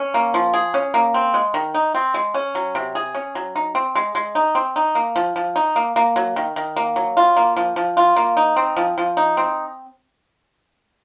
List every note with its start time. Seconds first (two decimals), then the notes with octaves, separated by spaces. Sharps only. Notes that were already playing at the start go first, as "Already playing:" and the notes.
Already playing: C#4
0.14 A#3
0.34 F3
0.54 G#4
0.74 C#4
0.94 A#3
1.14 C4
1.34 G#3
1.54 D#3
1.74 D#4
1.95 C4
2.14 G#3
2.34 C#4
2.55 F#3
2.75 C3
2.95 G#4
3.15 C#4
3.35 F#3
3.56 D#4
3.75 C4
3.95 G#3
4.15 G#3
4.35 D#4
4.55 C4
4.76 D#4
4.95 A#3
5.16 F3
5.36 F3
5.56 D#4
5.76 A#3
5.96 A#3
6.16 F#3
6.36 D#3
6.56 D#3
6.76 A#3
6.96 F#3
7.17 F4
7.37 A#3
7.56 F3
7.76 F3
7.97 F4
8.16 A#3
8.37 D#4
8.56 C4
8.77 F3
8.98 F3
9.17 D#4
9.37 C4